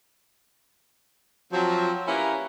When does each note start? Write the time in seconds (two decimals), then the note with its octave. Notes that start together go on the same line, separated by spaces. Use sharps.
1.53 F3 F#3 C4
2.07 A#3 C#4 E4 G4 A#4 B4